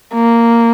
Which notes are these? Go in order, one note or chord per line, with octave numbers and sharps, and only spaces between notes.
A#3